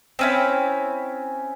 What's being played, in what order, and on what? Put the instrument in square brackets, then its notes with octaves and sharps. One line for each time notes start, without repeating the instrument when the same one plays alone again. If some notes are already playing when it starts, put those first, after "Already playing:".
[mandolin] C4 C#4 E4